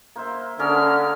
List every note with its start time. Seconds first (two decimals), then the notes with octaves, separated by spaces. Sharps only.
0.16 A#3 C5 E5
0.59 D3 C#4 G#4 A#4 F6